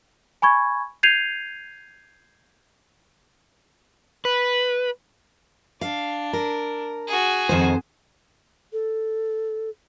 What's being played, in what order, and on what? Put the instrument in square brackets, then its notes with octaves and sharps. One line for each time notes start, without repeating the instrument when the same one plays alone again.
[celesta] G#5 B5 C#6 G#6
G6 G#6 C7 D#7 F7
[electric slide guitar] B4
[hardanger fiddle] D4 [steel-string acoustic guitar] F5
[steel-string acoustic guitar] A#4
[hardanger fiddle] F#4 G#4
[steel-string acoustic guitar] F2 D#3 C5
[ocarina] A4